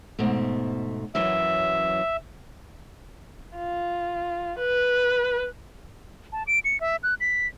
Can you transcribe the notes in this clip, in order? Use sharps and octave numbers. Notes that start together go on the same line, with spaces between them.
G#2 B2 A3
F#2 E3 F#3 E5
F4
B4
A5
D7
C#7
E5
F#6
B6